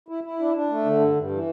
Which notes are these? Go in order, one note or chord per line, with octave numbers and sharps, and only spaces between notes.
E4
E4
D4
D4
A3
D3
G2
G2
E3